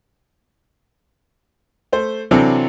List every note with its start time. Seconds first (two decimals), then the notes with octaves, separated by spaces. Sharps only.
1.92 A3 C5
2.31 C3 E3 F#3 C4 D4 A4